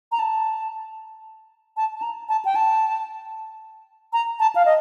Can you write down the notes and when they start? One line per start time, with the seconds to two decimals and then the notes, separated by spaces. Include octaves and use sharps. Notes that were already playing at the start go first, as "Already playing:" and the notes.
0.12 A#5
0.19 A5
1.77 A5
1.95 A5
2.02 A#5
2.29 A5
2.45 G5
2.55 A5
4.13 A#5
4.40 A5
4.55 F5
4.65 D#5